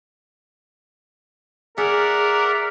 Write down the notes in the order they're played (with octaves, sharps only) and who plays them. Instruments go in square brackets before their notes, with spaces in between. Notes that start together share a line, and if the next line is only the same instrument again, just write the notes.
[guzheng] G#4 [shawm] A#4 [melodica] D5 E5 F#5